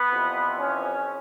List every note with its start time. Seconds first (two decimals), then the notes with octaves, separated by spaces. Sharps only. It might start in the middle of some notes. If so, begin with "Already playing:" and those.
Already playing: B3
0.10 F2 C3 E3
0.58 C#4